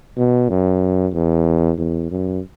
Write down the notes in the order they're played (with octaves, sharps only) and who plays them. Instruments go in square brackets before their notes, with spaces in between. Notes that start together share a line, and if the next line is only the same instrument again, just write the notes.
[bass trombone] B2
F#2
E2
E2
F#2